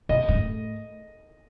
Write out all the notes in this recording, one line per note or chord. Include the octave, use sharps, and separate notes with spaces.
B2 D#5
G2
A2